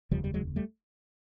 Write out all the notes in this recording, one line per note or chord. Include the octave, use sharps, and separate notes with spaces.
F1 D#2 C#3 F3 G3
G3
F#3 G#3
G3 A3